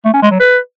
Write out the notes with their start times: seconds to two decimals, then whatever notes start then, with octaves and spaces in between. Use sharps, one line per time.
0.05 A3
0.13 C#4
0.22 G#3
0.31 F#3
0.40 B4